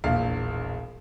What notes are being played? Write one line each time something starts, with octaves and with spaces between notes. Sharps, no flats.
E1 A#1 F5